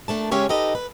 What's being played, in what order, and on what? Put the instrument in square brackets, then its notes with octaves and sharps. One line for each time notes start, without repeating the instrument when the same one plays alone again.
[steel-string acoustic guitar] A#2 A3 D4 A5
C#3 G#3 C#4 G4 C#5 E5
D#4 G4 A4 B4 D#5
B4